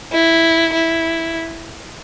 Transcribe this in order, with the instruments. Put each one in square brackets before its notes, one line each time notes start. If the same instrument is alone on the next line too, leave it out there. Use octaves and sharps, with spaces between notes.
[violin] E4
E4